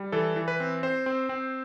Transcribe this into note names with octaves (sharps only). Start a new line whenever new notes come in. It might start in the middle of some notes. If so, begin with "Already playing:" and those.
Already playing: G3
E3 A4
E3
B4
C4
C4 C5
C4
C4